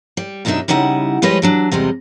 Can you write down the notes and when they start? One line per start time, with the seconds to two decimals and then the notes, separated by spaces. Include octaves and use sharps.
0.17 G3
0.45 F#2 B2 F#3 D4 D#4 E5
0.68 C#3 G3 D#4 E4 F#5
1.22 F3 G3 G#3 B4 C#5 D#5
1.42 E3 F#3 D4
1.71 E2 C3 G3 G#3 D#5